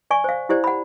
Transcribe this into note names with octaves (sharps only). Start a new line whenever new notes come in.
D5 G#5 C#6
C5 F5
E4 G4 C5 D5
F#5 B5